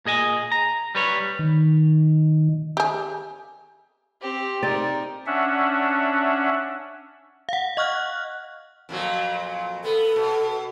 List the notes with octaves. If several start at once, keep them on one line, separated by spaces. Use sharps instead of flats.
A#2 G#4 D#5 G#5
A#5
G3 B4 C#5
D#3
G4 G#4
C4 G4
C4 D#4 A#4 D5
C#4 D4 E5 F#5
F5 F#5
D#5 C#6 F6 F#6
F2 A#2 F#3
B3 A4
B2